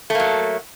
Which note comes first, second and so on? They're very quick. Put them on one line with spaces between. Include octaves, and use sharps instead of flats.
A3 A#3 F#3